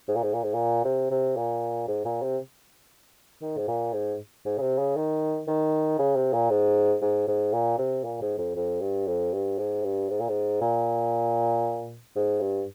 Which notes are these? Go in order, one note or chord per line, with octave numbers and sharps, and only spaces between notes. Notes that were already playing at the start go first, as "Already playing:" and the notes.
G#2
A#2
G#2
A#2
G#2
A#2
C3
C3
A#2
G#2
A#2
C3
D#3
G#2
A#2
G#2
G#2
C#3
C3
C#3
D#3
D#3
C#3
C3
A#2
G#2
G#2
G#2
A#2
C3
A#2
G#2
F2
F2
G2
F2
G2
G#2
G2
G#2
A#2
G#2
A#2
G#2
G2